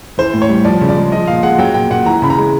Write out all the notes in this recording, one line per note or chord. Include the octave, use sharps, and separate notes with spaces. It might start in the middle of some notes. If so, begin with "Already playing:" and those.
E3 C5
A2
C#5
G3
F3 D5
C#3
D5
G#3
F3 D#5
A#2 F5
G#3 F#5
F#3 G5
A#2 G5
A#2 F#5
E3 A#5
C#3 B5
A#5
G#3